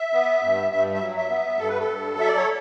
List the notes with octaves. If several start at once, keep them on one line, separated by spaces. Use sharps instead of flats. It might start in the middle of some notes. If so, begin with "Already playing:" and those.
Already playing: E5
B3
G2
G2 E5
E5
F#3
E5
B3
G2 A4
B4
A4
G2
F#3 E5
D5
C#5